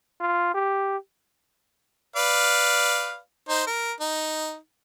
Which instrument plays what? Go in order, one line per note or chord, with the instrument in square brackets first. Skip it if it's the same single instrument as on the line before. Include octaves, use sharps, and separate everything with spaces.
[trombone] F4
G4
[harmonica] B4 D5 F5
D#4 C5
A#4
D#4